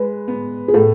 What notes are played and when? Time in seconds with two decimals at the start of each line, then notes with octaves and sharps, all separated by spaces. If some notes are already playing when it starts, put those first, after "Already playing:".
Already playing: G#3 B4
0.28 B3
0.68 G#4
0.74 A2 A4